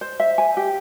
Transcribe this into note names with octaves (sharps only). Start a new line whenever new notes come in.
C5
E5
G#5
G4